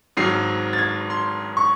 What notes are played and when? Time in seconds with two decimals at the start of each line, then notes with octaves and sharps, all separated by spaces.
0.17 G#1 G#2 D#3 F#3 C7
0.73 A6
0.79 G#6
1.10 C6
1.57 C#6